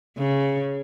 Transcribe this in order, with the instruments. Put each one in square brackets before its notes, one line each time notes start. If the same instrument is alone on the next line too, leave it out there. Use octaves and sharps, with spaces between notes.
[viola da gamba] C#3